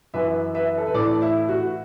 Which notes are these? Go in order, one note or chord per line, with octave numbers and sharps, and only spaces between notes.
F#2 E3 B4 E5
B4 E5
A4
B4
A2 E3 A4 D5
E4
F#4